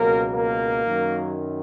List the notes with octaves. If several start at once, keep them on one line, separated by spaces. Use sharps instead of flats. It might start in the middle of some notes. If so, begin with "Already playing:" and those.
Already playing: C#2 B2 F#3 A#3 A#4
A#3 A#4
F#2 D#3 F#3